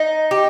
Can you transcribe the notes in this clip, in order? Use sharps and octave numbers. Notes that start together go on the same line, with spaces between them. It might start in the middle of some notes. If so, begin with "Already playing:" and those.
Already playing: D#4
G4